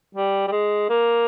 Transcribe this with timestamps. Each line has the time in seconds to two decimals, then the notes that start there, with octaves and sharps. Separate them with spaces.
0.15 G3
0.48 G3
0.51 G#3
0.90 A#3